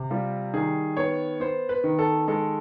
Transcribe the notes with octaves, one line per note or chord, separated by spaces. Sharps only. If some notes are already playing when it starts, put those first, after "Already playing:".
Already playing: C3
G3 F4
D#3 G#4
B3 C#5
B3 C5
B4
D#3
A4
G#3 A4